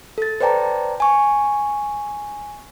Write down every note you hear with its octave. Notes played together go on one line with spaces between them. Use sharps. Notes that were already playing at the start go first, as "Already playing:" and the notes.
A4 A6
B4 C5 D5 G5 A5 A#5
G#5 C#6